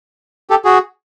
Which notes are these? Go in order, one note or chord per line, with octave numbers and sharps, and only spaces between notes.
G4 A4
F#4 G#4